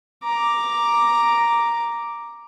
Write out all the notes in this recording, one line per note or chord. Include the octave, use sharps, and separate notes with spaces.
A#5 D6